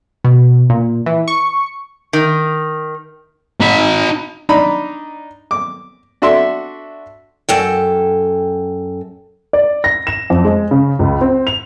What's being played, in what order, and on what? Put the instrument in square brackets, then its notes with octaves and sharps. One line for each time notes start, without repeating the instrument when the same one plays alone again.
[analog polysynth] B2
A#2
E3
C#6
[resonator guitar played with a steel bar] D#3
[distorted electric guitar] D#4 B5
[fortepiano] D4 D#4 A#5 B5
D6
D4 F#4 A4 E5 C6
[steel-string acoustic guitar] F#2 A4 G5
[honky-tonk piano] D5
A#6
E7
F2
G#3
C#3
C#2
C4
F7